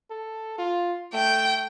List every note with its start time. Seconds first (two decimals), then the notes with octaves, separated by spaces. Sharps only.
0.10 A4
0.58 F4
1.14 A3 G5